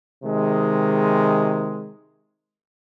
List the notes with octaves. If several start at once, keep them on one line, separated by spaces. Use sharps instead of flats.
C3 D#3 G#3